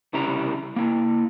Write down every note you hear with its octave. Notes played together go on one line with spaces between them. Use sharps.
C2 C#3 E4 G4 A#5
A#3 E4